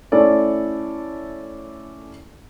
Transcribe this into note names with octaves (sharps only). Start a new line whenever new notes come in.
A3 C#4 E4 A4 D5